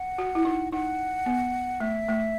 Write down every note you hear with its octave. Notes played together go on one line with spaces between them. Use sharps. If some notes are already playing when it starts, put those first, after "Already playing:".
Already playing: F#5
F#4
E4
D#4
D#4 F#5
B3
A3 E5
A3